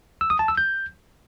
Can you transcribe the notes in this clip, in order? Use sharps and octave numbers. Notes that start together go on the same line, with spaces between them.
E6
D#6
A5
E6
G6